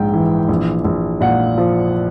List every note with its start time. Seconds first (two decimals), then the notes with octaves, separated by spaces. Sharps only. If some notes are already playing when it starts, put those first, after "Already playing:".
Already playing: A#1 G#2 G5
0.13 E3
0.49 A#1
0.84 A#1
1.21 A#2 F#5
1.58 F3